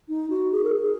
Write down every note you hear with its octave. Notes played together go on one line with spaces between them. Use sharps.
D#4
F#4
G#4
A#4
G#4